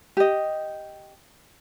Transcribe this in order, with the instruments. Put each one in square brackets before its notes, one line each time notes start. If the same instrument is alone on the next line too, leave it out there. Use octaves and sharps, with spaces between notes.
[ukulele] G4 D#5